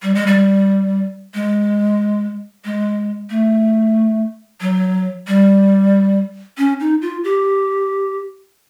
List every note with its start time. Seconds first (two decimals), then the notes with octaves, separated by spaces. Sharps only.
0.03 G3
0.15 G#3
0.27 G3
1.34 G#3
2.65 G#3
3.30 A3
4.61 F#3
5.27 G3
6.58 C#4
6.80 D#4
7.02 F4
7.24 G4